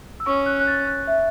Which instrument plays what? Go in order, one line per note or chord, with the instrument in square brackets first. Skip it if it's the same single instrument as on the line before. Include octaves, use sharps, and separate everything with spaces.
[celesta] E6
[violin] C#4 [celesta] C#6
[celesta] F#6
F#6
A6
F#6
E5